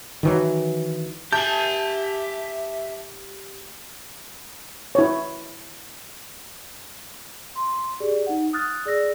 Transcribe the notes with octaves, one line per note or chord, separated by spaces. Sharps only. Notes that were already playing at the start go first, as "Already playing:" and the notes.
D#3 E3 F#3
G4 E5 G#5 A5 G6
E4 C#5
C6
G4 G#4 D5
D#4 F#5
D#6 F6 F#6 A6
G#4 D5 E6 A#6